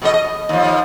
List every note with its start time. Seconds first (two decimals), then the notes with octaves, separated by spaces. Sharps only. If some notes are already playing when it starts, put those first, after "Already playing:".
0.02 B2 A3 D#5
0.14 D#5
0.49 D#2 F3